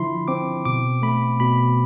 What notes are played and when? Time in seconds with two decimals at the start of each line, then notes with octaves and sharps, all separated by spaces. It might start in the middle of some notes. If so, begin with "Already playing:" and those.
Already playing: D3 F3 E4 B5 C6
0.28 C4 D6
0.65 B2 D6
1.02 A3 B5
1.40 B2 B5